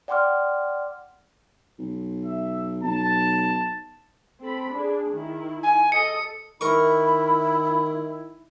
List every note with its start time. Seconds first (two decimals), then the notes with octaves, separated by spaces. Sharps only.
0.08 D5 F#5 G5 C6 D6 F6
1.79 B1
2.25 E5
2.83 B1 A5
4.40 C4 A4 B5
4.72 D4 G#4
5.12 D#3 E4
5.63 G#5
5.92 A4 D#5 C#7
6.61 D#3 E4 A#4 B5 C#6